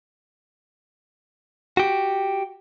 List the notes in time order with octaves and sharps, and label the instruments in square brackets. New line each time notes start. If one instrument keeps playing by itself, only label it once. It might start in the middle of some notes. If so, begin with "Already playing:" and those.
[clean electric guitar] F#4 G4